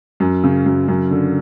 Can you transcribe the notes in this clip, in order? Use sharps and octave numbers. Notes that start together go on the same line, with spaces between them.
F#2
C#3
F#2
F#2
D3